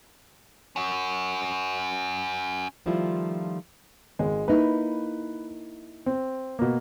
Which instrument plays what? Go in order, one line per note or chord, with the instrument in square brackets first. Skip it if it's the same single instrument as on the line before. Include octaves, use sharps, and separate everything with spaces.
[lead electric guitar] C#4 F#4
[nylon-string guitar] D#3 F3 G3 A3 E4 F4
[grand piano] G#1 G#3
[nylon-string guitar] A#3 D#4 E4 [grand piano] B4
[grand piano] C4
B2 A#3